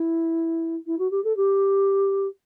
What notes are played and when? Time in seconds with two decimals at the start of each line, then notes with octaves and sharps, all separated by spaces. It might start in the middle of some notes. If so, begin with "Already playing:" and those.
Already playing: E4
0.86 E4
0.98 F#4
1.10 G4
1.24 A4
1.36 G4